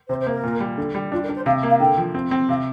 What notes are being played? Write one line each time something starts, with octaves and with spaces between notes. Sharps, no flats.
C3 C5
C5
A#3
A#4
A#2
G3
D3
G3
D4 F4
A#4
D4
C5
C3 F5
A#3
F5
D3 G5
F3
C4
C4
C3 F5